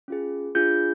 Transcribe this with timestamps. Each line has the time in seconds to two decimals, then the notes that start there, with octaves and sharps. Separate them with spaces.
0.08 C#4 F4 G#4
0.55 D4 F4 G#4 G6